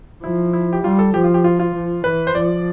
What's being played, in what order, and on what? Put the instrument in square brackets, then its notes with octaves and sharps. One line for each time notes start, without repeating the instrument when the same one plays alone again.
[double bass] F3 [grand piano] E4
[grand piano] E4
G4
[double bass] G3 [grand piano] F4
[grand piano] A4
[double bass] F3 [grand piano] G4
[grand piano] F4
G4
F4
F4
[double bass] F3
[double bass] E3 [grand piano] B4
[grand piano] C5
[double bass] F3 [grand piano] D5